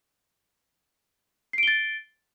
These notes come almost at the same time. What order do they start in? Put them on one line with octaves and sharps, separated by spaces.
C7 D7 G7 A6